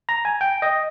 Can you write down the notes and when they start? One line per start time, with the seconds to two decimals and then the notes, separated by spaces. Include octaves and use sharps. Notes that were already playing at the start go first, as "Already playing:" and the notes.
0.09 A#5
0.25 G#5
0.41 G5
0.62 D#5